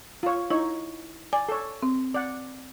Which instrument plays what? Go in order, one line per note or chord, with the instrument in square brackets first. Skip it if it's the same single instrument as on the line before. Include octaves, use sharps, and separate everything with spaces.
[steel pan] F4 C#5
[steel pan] D#4 C#5 [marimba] E4
[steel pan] D5 [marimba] G#5
[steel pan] A4 C#5
[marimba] C4
[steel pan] D5 F#5